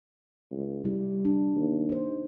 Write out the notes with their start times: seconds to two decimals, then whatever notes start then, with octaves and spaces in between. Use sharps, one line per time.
0.52 C#2
0.84 C3 G3 E4
1.25 D4
1.56 D#2
1.89 D#4 C5